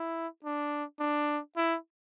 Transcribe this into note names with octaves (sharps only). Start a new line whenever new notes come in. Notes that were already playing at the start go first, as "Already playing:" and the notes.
Already playing: E4
D4
D4
E4